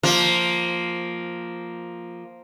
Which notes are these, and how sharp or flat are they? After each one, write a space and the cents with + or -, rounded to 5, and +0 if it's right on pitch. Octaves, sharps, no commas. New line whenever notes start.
F3 +0 A#3 +0 F4 +0